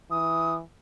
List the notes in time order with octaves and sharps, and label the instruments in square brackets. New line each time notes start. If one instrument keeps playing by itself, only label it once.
[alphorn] E3 [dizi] D#6